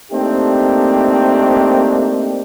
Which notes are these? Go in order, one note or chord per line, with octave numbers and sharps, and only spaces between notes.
A3 A#3 C4 D4 D#4 G4